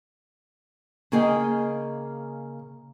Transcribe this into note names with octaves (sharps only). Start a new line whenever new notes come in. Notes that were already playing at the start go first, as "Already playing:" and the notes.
C#3 A#3 G#4 D#5 G5